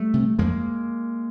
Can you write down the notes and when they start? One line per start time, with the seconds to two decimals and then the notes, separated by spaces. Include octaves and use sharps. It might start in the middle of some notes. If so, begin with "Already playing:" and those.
Already playing: G3 A3
0.14 C3
0.39 F2 G#3 A#3